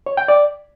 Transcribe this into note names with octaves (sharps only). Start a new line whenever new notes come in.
C#5
G5
D5